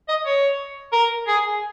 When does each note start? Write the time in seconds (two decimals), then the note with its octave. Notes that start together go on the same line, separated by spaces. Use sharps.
0.09 D#5
0.26 C#5
0.93 A#4
1.27 G#4